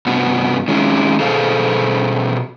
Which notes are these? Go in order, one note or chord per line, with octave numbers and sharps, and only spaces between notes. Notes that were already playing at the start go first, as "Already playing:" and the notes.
G2 C3 B3 F#4
D#3 G#3 C#4 E4
B2 G#4 A4 C5 F5